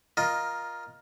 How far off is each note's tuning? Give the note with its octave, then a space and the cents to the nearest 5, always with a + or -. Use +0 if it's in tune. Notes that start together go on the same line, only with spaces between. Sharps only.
F4 +0 A#4 +15 D#5 +0